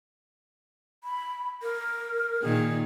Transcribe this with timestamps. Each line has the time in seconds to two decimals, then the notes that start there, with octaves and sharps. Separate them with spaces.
1.04 B5
1.62 A#4
2.42 A#2 D#3 G#4